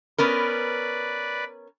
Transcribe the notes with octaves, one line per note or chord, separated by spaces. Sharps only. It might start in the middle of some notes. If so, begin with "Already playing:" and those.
B3 C#4 A#4 B4 D5